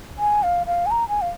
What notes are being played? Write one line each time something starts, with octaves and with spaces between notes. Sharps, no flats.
G#5
F5
F5
G#5
A#5
G#5
F5